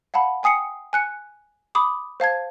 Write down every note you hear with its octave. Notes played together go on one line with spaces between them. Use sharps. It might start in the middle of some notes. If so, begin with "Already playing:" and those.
F5 F#5 A5 B5
G5 G#5 D#6 C7 C#7
G#5 F#6 C#7
B5 D6 D#6
C5 F5 A5 G#6